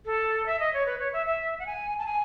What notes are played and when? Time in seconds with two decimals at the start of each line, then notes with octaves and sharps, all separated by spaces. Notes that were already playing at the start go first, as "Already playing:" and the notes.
0.06 A4
0.46 E5
0.60 D#5
0.73 C#5
0.86 B4
0.99 C#5
1.13 E5
1.27 E5
1.59 F#5
1.67 G#5
1.99 A5
2.06 G#5